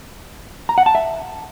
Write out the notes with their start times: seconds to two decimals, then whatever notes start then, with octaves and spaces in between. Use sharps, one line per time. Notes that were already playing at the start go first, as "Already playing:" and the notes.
0.69 A#5
0.78 F#5
0.86 A5
0.95 E5